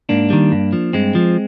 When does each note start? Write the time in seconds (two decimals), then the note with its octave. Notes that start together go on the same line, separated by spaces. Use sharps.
0.09 G#2 A#3 D4
0.30 D#3 G3
0.52 G2
0.73 F3
0.93 G2 G#3 C4
1.15 F3